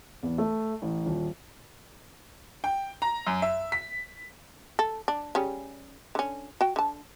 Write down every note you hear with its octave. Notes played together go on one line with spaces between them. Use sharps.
E2
A3
A1
D#1
G5
A#5
F#2
E5
B6
A4
D4
C#3 G3 C#4
D3 C#4
F#4 G5
D3 A5